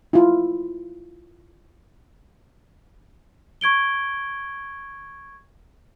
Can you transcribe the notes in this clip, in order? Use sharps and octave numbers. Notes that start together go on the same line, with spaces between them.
E4 F4
C#6 G#6 D7 G7